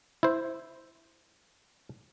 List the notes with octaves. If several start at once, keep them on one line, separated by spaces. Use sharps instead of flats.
E4 C5